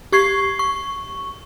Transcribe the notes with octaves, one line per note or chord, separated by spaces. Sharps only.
G4 C#6 G#6 C7
C#6